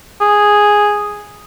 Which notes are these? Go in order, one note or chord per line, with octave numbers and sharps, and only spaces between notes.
G#4